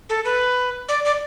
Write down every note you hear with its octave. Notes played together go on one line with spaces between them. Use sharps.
A4
B4
D5
D5